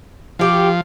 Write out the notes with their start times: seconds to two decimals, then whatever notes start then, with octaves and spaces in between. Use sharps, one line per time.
0.39 F3 F#4 G4